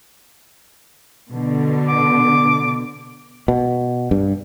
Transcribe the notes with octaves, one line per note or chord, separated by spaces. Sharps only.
B2 D3
D6
B2
G2